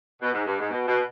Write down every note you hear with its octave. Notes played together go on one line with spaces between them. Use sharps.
B2
G#2
G2
G#2
B2
B2